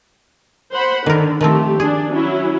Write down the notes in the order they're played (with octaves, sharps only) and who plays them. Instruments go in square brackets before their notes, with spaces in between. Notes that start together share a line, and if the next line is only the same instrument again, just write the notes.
[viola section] C5 F#5 B5
[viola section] D3 [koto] D#3 A#4
[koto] D#3 F3 C4 [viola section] A3 G4
[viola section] D4 [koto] G#4
[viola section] F#3 C#4 E4